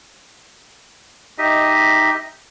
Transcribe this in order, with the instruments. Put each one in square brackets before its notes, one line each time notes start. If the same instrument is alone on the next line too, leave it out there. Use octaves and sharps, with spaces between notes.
[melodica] D#4 G4 D#5 E5